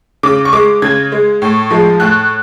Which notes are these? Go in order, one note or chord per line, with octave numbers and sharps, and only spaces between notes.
C#3 D6
C#6
G#3 D6
C#3 G#6
G#3
A2
F3 G#3
A2 F#6